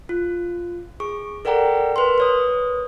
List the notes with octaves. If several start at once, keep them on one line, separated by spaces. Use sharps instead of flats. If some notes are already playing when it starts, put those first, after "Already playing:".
F4
G#4 C#6
A4 A#4 D5 F#5 G5 A#5
A#4 B4 C6
B4 C#5 D#6